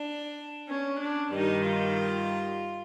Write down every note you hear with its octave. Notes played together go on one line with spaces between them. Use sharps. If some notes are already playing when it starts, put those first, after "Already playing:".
Already playing: D4
C#4
D4
G2 D#3 G3 D#4
F4